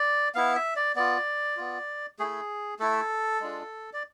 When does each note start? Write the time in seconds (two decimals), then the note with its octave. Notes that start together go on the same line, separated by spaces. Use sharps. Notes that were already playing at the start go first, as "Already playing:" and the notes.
Already playing: D5
0.35 B3 E4 F5
0.56 E5
0.76 D5
0.96 B3 F4 D5
1.57 B3 F4
2.19 A3 E4 G#4
2.79 A3 E4 A4
3.41 G#3 D4 F4
3.93 D5